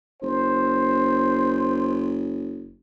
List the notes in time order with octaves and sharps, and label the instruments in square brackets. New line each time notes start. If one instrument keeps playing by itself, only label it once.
[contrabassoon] F#1 [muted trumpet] C5